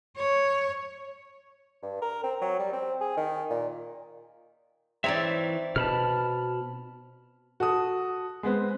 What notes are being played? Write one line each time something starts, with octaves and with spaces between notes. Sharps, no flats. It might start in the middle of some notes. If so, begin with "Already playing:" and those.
C#5
G2
A#4
C4
F#3
G3
C4
G#4
D#3
A#2
E3 C4 D#4 C#5 D5 E5
B2 A5 B5 F6
F#4 A4 D#6
G#3 B3 C4